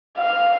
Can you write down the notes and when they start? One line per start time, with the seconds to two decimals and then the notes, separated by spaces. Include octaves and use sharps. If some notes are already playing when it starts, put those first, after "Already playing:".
0.17 F5